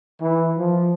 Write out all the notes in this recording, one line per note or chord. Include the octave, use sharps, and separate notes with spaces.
E3
F3